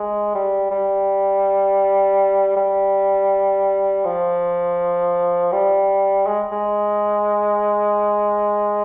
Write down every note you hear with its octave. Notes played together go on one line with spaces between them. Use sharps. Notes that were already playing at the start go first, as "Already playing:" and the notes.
Already playing: G#3
G3
G3
G3
F3
G3
G#3
G#3